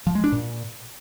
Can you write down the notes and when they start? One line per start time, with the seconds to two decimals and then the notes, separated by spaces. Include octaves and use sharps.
0.07 F3
0.15 G#3
0.24 D4
0.32 A#2